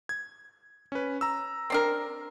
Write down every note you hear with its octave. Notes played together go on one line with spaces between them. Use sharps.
G#6
C#4 B4
A#5 E6
C4 D4 A#4